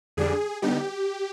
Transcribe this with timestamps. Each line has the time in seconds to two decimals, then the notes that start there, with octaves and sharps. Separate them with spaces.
0.17 F2 D3 G3 D4 G#4
0.62 D3 G3 B3 D#4 G4